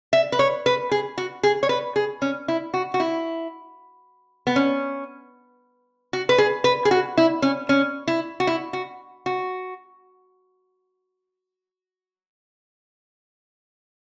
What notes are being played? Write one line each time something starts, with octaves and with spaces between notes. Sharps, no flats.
E5
B4
C#5
B4
G#4
F#4
G#4
C#5
B4
G#4
C#4
E4
F#4
F#4
E4
B3
C#4
F#4
B4
G#4
B4
G#4
F#4
E4
C#4
C#4
E4
F#4
E4
F#4
F#4